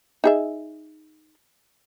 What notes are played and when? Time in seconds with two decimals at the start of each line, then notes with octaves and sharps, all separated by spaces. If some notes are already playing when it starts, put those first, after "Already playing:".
0.24 D#4 G#4 E5